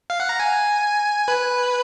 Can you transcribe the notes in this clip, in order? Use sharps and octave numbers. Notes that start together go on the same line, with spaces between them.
F5
F#5
A#5
G#5
B4